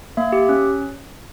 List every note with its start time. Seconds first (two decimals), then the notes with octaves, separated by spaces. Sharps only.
0.17 A#3 E5
0.33 G4
0.49 C#4